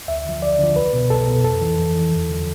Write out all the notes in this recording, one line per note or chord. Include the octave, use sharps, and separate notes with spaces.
D2 E5
D3 F3
D2 D5
D3 F3
C2 B4
B2
C2 A4
B2
F2 A4
E3
F2
E3
E2
D3 F3